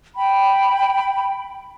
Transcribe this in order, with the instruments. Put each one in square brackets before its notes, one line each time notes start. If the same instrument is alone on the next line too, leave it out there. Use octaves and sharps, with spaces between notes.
[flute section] G5 B5